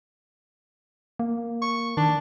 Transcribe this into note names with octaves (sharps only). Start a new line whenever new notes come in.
A#3
C#6
D#3 D4